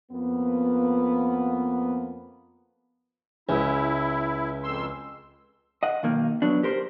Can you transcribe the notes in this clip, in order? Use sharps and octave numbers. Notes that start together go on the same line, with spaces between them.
F2 A#3 B3
C#2 E4
F2 C6 E6
D#5 F#5
B1 D#3 A#3
F#3 B3 D4
G4 A#4 C5